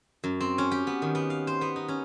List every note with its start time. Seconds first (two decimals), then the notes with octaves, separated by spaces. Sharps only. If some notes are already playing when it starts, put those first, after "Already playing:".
0.24 F#2
0.40 C4
0.58 C#4
0.71 G4
0.87 B3
1.02 D#3
1.15 B3
1.30 F5
1.47 C5
1.61 B3
1.76 D#4
1.88 C#4